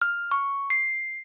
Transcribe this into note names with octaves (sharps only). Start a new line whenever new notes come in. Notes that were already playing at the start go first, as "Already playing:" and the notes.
F6
C#6
C7